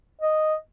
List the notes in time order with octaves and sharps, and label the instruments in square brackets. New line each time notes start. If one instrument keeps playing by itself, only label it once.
[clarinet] D#5